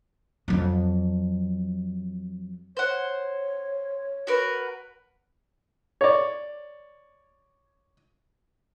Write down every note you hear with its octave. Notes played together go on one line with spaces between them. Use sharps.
F2 F#3
C5 C#5 F#5
F#4 A#4 B4
C#5 D5